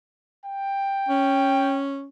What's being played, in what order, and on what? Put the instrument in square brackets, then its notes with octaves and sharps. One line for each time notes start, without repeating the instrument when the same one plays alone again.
[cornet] G5
[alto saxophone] C#4